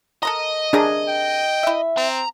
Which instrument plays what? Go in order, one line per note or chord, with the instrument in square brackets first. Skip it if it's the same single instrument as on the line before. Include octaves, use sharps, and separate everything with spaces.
[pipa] A4 A#4 A#5 [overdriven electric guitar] D#5
[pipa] C3 A#4 A#5 [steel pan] D4 G#4
[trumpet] G5
[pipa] E4 E5
[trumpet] C4 [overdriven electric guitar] A#5